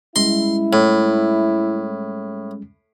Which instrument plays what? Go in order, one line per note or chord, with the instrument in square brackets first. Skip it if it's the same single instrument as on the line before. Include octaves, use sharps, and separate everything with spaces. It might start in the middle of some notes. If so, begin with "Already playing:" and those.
[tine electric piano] G3 G#3 C#4 [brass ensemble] E4 [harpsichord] C6
[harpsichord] A2